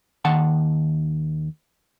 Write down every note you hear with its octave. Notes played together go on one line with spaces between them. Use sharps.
D#2 D#3 F#5 A5